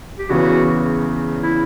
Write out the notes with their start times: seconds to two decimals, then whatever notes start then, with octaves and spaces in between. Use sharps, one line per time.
0.18 G4
0.30 E2 C#3 E3 F#4
1.43 E4